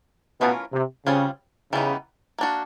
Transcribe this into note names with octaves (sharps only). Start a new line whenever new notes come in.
B2 E3 A3 C#4 F4 A#4
C3
C#3 G3 C4 F4 G#4 C#5
C#3 E3 G3 B3 D#4
A#3 D4 F#4